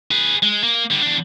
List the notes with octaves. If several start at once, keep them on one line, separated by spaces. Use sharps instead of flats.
G#4 B4
G#3
A#3
D3 G3
E2 D4